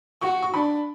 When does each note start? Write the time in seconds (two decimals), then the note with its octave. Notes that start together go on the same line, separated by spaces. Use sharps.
0.21 F#4 C#6
0.43 C#6
0.54 D4 B5